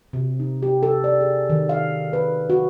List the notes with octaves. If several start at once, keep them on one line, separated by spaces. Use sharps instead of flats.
C3
D#4
G4
A4
D5
G#4
D#3
F5
B4
F#4